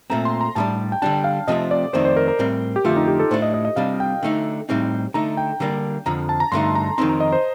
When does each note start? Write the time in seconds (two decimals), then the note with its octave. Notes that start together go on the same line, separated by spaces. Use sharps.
0.10 A#2 A3 C4 A#5
0.25 C6
0.41 A#5
0.55 A2 G3 D4 A5
0.92 G5
1.02 D3 G3 D4 A5
1.13 G5
1.24 F5
1.48 C3 F3 A3 C4 D#5
1.71 D5
1.93 F2 D#3 A3 C4 C5
2.05 C5
2.17 A#4
2.28 A#4
2.39 A2 G3 C4
2.76 G4
2.85 F2 D3 A3 F4
2.96 D#4
3.08 G4
3.19 A4
3.31 A2 A3 D4 C5
3.42 D#5
3.54 D#5
3.65 D#5
3.76 C3 G3 D4 F5
4.00 G5
4.23 D3 A3 D#4
4.69 A2 G3 C4 D#4
5.14 D3 A3 D#4 A#5
5.37 G5
5.60 D3 G3 A#3 D4
6.06 F2 D3 F3 A#5
6.29 A5
6.40 A#5
6.52 G2 D3 A3 D#4 C6
6.75 A#5
6.98 F2 D#3 A3 C4 D#4 C6
7.09 A#5
7.20 D#5
7.32 C5